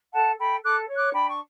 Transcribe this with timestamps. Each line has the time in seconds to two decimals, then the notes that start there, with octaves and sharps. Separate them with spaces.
0.13 A4 F#5 A5
0.38 A4 G5 B5
0.63 A4 D6 F#6
0.88 C#5
0.96 D6 F#6
1.13 D4 G5 B5
1.29 C#6